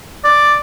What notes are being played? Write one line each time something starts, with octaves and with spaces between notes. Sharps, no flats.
D5